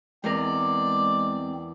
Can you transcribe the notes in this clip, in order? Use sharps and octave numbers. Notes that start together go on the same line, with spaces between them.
E2 G#3 C4 A#4 D5